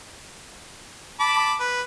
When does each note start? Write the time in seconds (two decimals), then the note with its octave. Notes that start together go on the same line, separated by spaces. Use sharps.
1.20 A5 B5 D6
1.60 B4